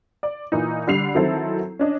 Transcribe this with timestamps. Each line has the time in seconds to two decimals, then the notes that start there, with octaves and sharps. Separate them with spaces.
0.23 D5
0.52 A#2 E3 D#4
0.87 D3 G3 C7 F7
1.15 D#3 F#3 C4 E4 A4
1.79 C#4 D4 D#5